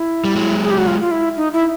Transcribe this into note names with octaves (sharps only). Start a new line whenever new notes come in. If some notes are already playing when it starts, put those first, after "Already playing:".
Already playing: E4
G3
F#3 G#3
G#4
G4
F#4
F4
F4
E4
D#4
E4